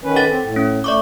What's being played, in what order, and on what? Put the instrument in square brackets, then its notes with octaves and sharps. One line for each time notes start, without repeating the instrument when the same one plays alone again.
[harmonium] D#3 C#4 B4
[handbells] A4 F#5 A6
[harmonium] C4
A2
[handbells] C#4
[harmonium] A3 [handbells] D5 C#6 D6